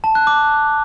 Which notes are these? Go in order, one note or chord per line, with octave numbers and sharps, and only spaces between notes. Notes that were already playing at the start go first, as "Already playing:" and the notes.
A5
F#6
D6